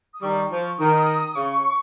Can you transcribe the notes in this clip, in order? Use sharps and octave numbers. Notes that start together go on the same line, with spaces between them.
D#6
D#3 G3 C#6
F3
D#3 D#6
C#3 C#6